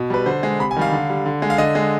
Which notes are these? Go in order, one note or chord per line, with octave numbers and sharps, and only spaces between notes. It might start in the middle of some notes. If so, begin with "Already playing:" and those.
Already playing: B2
G3 B4
D3 C5
G#3
C3 B5
G#5
D#3 G3 F5
D3
G3
D3
G#3
F5
D3 D#5
G#3